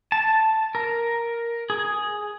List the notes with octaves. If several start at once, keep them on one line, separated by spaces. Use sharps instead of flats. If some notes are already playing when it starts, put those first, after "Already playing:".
A5
A#4
G#4